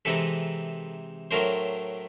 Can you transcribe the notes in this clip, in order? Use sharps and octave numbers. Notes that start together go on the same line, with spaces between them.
C3 E3 G#3 C4 D#4 A4 B4
A2 F#3 A3 D4 A#4 C5